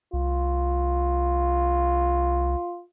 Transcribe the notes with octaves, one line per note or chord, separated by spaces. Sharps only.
C2 F4